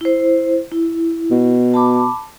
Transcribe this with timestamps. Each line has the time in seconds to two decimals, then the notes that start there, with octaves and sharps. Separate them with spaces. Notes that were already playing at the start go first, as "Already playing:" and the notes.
0.01 E4 C5
0.72 E4
1.31 B2
1.74 A5 B5 D6